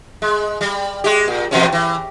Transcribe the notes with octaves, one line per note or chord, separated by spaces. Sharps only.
G#3
G3
G#3 G4
A#2
E2 B2 C#4
E3